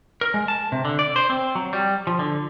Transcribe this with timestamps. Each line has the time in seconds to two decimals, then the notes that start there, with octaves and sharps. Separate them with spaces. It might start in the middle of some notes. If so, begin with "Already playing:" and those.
0.21 A#4
0.34 G#3
0.48 A5
0.72 C3
0.85 D3
0.99 D5
1.16 C5
1.30 C4
1.55 F#3
1.73 G3
2.07 F3
2.19 D3